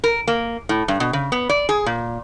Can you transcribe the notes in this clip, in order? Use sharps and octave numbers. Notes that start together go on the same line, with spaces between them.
A#4
A#3
A2
G2
B2
C#3
B3
D5
G#4
A#2